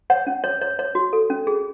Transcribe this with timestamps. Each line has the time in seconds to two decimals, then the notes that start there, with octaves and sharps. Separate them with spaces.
0.10 C#5 F#5
0.27 C#4
0.44 C#5
0.62 C#5
0.79 C#5
0.95 F#4
1.13 A4
1.30 C#4
1.47 G#4